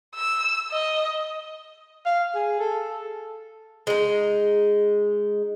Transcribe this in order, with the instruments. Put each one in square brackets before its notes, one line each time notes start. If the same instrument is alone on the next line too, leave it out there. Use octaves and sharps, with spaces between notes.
[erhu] E6
D#5
[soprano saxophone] F5
G#4
A4
[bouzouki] G#3 D#4